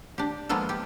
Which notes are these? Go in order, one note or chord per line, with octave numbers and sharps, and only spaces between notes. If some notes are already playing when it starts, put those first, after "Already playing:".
D4 G4
F3 G#3 A#3 B3 F4 A4
G4